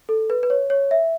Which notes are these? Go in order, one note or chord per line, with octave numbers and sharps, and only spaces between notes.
A4
B4
B4
C#5
C#5
E5